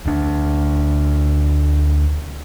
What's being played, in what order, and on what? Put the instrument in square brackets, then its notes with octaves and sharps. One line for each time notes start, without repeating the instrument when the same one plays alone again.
[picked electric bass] D2 D4